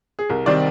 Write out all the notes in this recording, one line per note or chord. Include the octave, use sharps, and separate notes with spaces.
G#4
C2 A#4
C3 D#3 G3 C4 D5